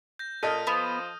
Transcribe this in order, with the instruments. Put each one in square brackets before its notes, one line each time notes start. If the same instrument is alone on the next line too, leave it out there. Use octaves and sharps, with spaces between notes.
[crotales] G6 A#6
[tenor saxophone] A#2 [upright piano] A4 D#5 A5 [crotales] D#6 F6 D#7
[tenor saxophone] F3 [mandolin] B3